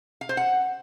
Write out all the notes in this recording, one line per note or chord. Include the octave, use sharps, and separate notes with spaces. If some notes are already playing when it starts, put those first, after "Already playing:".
F5
C5
F#5